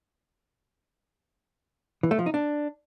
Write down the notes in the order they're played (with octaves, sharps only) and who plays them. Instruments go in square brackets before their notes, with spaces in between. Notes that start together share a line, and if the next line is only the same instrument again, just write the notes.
[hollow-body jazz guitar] E3
A3
F3
D#4
D4